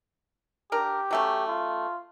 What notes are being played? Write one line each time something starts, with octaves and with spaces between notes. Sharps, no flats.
D4 G4 A#4
F#3 A3 C#4
F4